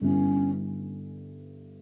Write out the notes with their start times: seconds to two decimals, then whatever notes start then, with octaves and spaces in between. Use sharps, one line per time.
0.01 G2 D3 G3 B3 C#4 E4